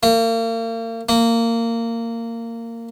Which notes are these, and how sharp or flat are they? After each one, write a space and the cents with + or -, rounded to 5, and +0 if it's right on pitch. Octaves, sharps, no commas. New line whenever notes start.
A#3 -40
A#3 -20